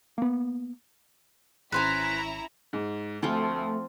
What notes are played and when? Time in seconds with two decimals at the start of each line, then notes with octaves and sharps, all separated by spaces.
0.18 A#3 B3
1.72 G#1 C#4 E4 B4 C5 G#5 A#5 B6
2.73 G#2
3.23 D2 F3 A3 C4 F4 A4